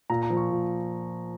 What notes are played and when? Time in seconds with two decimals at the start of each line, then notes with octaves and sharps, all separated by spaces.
0.10 A#2 A#5
0.23 A#5
0.30 F3
0.37 C#6
0.50 A#2